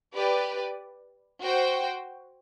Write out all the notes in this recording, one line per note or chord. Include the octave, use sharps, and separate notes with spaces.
G4 B4 D5
F#4 C5 G5